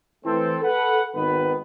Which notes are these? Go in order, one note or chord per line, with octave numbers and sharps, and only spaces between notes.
E3 A3 C4 A4
A4 B4 F#5
G#1 D#3 B3 B4